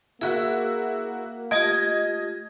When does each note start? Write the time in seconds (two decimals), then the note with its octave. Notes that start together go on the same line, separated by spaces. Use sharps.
0.21 A#3 E4 F#4 G#4 E5
1.51 A3 F4 G4 D#5 G#6